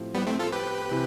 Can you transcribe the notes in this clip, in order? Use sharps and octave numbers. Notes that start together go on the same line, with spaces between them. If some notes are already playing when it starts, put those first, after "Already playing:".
Already playing: A2 F3 C4 G4
G3 B3
A3 C4
F4 A4
G4 B4
C3 E3